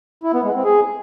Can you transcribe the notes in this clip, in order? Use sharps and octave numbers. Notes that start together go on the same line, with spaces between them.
E4
B3
G#3
C4
G#4